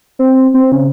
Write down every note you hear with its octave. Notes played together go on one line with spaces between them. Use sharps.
C4
C4
C#3